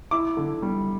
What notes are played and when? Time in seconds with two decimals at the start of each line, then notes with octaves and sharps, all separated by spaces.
0.11 E4 D6
0.37 D3
0.62 G3